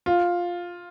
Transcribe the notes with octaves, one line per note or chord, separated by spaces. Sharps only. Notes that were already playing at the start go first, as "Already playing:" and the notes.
F4